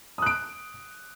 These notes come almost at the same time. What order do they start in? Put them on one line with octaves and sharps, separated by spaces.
D#6 F#6 D7